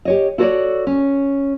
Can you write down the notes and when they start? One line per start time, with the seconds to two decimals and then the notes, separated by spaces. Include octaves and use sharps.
0.05 G4 C#5 D#5
0.38 E4 F#4 A4 A#4 C#5 D5
0.87 C#4